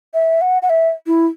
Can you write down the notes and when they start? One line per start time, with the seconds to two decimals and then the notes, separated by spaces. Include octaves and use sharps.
0.14 E5
0.41 F#5
0.62 F#5
0.70 E5
1.07 E4